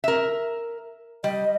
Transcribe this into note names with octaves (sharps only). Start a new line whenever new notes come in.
A#4 E5
G3 D#5